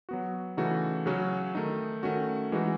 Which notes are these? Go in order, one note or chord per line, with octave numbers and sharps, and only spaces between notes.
F#3 B3 F#4
C#3 E3 A3 D#4 F#4
C#3 F#3 C#4 F#4
D#3 A3 D#4
D#3 A3 C#4 F#4
E3 G#3 D#4 F#4